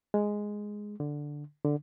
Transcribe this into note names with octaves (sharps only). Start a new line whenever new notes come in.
G#3
D3
D3